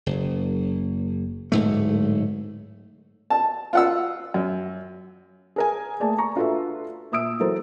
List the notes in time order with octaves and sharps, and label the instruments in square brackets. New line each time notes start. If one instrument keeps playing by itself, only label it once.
[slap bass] F#1
D1 G#2 A3
[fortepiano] A5
F4 F#5 E6
F#2
[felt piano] G#4 A#4 G#5
A3 A#3 G#4 D5 G#5 A5
A#5 C#6
D4 F4 F#4 A4 B4 E5
A#2 E5 D#6 E6 D7
E3 F#3 F#4 A4 A#4 C5